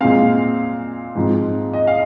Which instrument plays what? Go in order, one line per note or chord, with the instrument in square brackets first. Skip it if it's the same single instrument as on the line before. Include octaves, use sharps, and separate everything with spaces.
[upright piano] A#2 G#3 C4 F5
G#2 F3 C4
D#5
F5